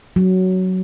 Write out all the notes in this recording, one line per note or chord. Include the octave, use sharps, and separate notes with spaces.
F#3